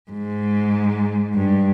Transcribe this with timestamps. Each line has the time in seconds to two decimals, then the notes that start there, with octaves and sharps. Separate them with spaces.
0.11 G#2
1.34 G2